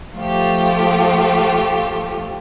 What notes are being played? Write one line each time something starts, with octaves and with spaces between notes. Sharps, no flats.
F3 A3 F4 G4